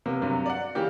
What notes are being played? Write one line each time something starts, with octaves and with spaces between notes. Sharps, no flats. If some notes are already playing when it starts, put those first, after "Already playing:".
C3 A#3 B3
G2 C3 F#3
D5 F#5
C#3 E3 A#3 G4